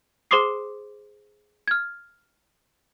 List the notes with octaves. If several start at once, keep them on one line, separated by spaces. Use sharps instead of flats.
G#4 C5 C6 D6 D#6 C7
F6 G#6